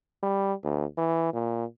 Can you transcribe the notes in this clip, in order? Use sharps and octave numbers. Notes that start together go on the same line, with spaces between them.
G3
D2
E3
A#2